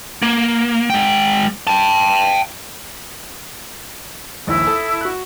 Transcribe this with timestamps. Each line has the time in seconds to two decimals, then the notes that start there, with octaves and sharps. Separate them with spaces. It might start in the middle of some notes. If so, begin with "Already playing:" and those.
0.22 A#3
0.90 G#3 G5
1.67 G5 A5
4.47 A#1 D#2 E4
4.67 A4 A5 D#6
5.01 F#4 F#6